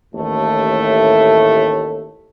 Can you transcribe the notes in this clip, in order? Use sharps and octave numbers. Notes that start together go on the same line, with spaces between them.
A1 D#2 A2 A3